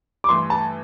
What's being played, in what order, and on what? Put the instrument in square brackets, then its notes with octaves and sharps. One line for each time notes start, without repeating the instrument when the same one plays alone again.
[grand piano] D6
[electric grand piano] G2 E3 A3 [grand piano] C6
[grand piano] A5